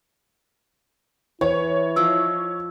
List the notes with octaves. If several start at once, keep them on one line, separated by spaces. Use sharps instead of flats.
E3 E4 C#5
F3 D#5 D6 E6